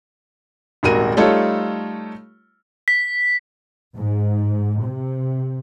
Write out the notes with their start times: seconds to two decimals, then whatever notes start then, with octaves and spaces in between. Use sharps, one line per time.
0.83 D#1 G#1 F#4 A#4 D#7
1.17 G3 A3 D#4 F4 A4 C#5
2.88 B6
3.96 G#2
4.83 C3